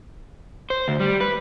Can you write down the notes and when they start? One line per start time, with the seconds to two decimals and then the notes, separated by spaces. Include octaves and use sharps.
0.70 C5
0.88 D2
1.00 G3
1.21 B4